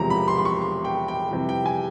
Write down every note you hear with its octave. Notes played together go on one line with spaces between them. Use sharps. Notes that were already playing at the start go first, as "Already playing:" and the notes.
Already playing: E1 E2 C3 F3 A#5
B5
C6
C6
C#6
C6
G5
G5
F2 C3 E3 G3 G5
G5
G#5